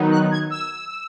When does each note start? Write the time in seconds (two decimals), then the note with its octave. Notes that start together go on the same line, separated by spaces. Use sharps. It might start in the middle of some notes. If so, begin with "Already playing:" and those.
Already playing: D#3 F#3 B3 D#4
0.11 F#6
0.31 G#6
0.50 E6